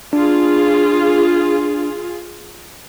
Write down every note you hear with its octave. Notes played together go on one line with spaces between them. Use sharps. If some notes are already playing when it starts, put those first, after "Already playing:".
D4 F4 G#4